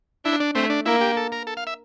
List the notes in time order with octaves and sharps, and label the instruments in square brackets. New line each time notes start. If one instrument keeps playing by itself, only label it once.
[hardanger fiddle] D4 [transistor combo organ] E4
[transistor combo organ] D4
[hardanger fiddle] A3 [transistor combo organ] C4
[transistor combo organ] D4
[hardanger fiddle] A#3 [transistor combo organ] E4
[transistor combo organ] G4
A4
A#4
A4
F5
E5